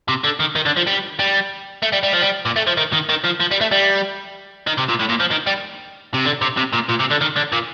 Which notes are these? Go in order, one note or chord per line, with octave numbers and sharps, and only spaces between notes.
C3
D3
D#3
D#3
D3
F3
G3
G3
A3
G3
G3
F3
G3
A#2
A3
F3
D#3
D#3
D#3
F3
F3
G3
A3
G3
D#3
C3
A#2
A2
A#2
F3
D#3
G3
C3
D3
C3
C3
A#2
A#2
C3
D3
D#3
D3
A#2